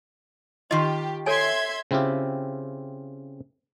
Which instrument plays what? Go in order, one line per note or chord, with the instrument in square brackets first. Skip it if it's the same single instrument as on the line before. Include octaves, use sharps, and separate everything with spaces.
[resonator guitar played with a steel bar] D#3 F4 [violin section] G4 [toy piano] D#5 C6
[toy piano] A4 C#5 G#5 [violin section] E5 C6 G#6
[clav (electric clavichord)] C#3 C4 E4 F4 G4